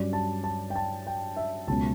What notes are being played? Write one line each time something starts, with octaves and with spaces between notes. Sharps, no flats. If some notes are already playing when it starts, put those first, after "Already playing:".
Already playing: G2 F#3 C#4 D5
A5
A5
G5
A5
G5
E5
C#2 B2 F#3 C#4 A5